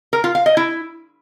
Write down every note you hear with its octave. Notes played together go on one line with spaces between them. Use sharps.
A#4
F4
F5
D#5
E4